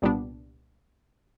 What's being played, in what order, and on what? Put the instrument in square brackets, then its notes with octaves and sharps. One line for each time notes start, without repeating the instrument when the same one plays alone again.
[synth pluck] C2 A#2 G3 B3 D4